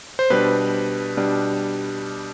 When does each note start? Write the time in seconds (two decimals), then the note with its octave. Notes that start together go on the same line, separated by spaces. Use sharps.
0.19 C5
0.30 B2 G3 D4 B4
1.17 B2 G3 D4